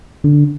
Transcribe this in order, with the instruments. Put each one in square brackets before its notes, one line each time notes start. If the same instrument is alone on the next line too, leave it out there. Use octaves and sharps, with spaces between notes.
[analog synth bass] D3